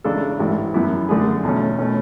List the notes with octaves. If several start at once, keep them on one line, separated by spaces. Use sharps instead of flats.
E2 C#3 G#3 D4 A4
A1 G#2 E3
F#2 E3 B3 E4
F#2 D3 A3 D4 G#4
E2 B2 A3 C#4
B2 A3 C#4